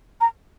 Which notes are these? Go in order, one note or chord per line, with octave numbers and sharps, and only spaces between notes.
A#5